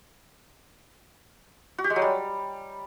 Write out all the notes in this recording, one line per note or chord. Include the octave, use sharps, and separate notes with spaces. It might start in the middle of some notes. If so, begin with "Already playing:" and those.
F#4
G4
G#3
F#3
G3